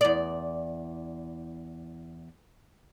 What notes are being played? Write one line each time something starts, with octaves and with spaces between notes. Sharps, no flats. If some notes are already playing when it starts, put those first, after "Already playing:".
E2 D5